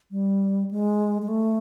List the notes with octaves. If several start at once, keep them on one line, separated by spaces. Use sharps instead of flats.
G3
G#3
G#3
A3